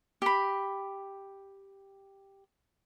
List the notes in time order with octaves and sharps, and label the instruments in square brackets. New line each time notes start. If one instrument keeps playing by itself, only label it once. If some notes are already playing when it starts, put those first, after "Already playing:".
[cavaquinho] G4 B5